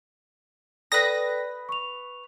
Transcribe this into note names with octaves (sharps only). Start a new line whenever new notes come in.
A4 B4 D5 G5 D#6 A#6
C#6 F7